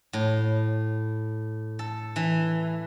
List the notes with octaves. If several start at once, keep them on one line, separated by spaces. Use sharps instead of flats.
A2
A4
E3